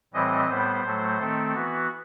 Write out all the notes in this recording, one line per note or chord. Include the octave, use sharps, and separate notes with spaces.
A2 E3 G3 C4 D#5
A2 G3 B3 C5
A2 F#3 A3
D#3 A3 C4 A4
E3 B3 F#4